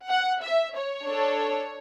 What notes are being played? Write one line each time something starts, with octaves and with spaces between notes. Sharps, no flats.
F#5
E5
C#5
D4 A4